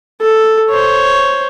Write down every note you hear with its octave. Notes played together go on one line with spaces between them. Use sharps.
A4
C5 C#5